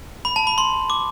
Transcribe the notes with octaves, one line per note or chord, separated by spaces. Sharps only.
B5
A5
B5
C6
D6